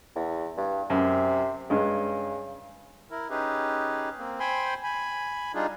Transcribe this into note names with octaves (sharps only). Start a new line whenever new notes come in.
E2
G2
F#2 C3
G2 C#3 G#3
E4 A#4
C#4 D#4 G4 G#4 B4
A#3 C4
C5 G5 G#5 B5 C6
G#5 B5
G3 D4 D#4 F4 G#4